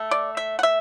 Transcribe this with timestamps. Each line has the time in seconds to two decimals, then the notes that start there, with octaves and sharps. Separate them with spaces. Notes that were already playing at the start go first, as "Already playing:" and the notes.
Already playing: A3
0.11 D5
0.37 E5
0.59 F#5
0.63 E5